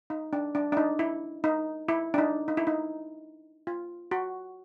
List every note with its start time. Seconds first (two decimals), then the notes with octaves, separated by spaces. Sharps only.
0.10 D#4
0.33 D4
0.55 D4
0.72 D4
0.77 D#4
0.99 E4
1.44 D#4
1.88 E4
2.14 D4
2.18 D#4
2.48 D#4
2.57 E4
2.67 D#4
3.67 F4
4.11 F#4